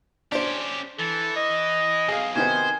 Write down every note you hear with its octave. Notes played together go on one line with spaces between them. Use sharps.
C#4 D4 G4 C5
E3 A4
D#5
B1 G#4 F5
C3 D#3 B3 C5 G#5